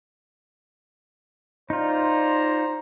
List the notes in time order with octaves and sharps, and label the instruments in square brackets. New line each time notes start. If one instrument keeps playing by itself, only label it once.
[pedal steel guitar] D#4 F4 [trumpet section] C5 D5 A#5